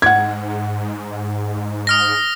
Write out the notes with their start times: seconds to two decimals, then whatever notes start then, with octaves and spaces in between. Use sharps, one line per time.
0.02 G#2 F#5 G#6
1.87 D#6 F6 A#6